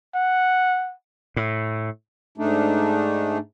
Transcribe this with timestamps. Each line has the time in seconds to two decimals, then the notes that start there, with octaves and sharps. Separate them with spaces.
0.15 F#5
1.36 A2
2.38 G#2 A3 D4 D#4